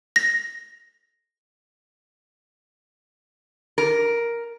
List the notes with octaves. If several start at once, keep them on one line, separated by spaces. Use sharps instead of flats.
A#6
A#4